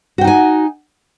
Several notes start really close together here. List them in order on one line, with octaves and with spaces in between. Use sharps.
F#4 G5 D#4 G#5